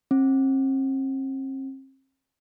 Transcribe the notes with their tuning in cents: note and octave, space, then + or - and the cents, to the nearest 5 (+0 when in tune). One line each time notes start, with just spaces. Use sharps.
C4 +40